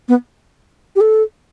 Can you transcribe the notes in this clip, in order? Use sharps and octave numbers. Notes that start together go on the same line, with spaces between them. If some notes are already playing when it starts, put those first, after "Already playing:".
B3
G4
A4